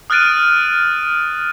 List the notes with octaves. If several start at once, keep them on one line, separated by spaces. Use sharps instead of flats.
D#6 F6 F#6 A6 D7 D#7